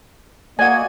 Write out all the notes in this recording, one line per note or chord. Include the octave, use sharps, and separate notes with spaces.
A#3 F#4 D5 D#5 F#5 G#5